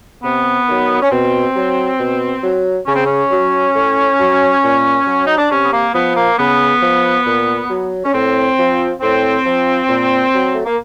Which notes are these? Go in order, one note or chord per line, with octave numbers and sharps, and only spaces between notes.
C3 B3
D#3 F#3
C#4
B2 C4
F#3
B2
F#3
C#3 C#4
C4
C#4
F#3
A2
F#3
A#2
F#3
D#4
D4
C3 C#4
B3
A#3
F3 B3
A#3
C#3 B3
F3
A#2
F#3
C#4
A2 C4
F3
A2 C4
F3
A#2
F#3
A3
A#3